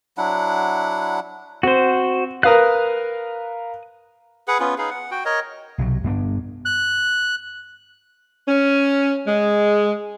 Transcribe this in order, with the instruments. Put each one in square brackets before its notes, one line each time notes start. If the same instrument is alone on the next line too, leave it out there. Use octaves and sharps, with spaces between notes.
[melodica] F#3 D4 E4 F#5
[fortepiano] C4 [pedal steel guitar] F#4 C5
[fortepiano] A#4 B4 F5 [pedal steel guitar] D#6 F#6
[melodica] G#4 B4 F#5
B3 C#4 F4 B4
D#4 G#4 B4 F5
F#5
F#4 G5
A#4 C#5 D#5
[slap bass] B1 C3 F#3
G2 B3 C4 D4
[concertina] F#6
[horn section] C#4
G#3